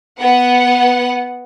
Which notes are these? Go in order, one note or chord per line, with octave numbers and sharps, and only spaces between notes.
B3 F#5